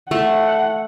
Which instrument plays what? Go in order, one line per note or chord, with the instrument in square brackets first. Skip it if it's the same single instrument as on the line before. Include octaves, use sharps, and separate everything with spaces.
[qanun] A3 [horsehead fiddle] F#5